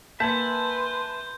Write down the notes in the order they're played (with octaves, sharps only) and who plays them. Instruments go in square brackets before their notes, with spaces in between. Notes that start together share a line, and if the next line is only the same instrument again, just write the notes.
[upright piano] A#3 A5 [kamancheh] B4 C6 [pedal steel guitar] E5 F#5 G#5 [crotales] G6